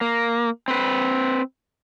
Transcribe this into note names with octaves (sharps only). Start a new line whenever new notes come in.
A#3
C4 B4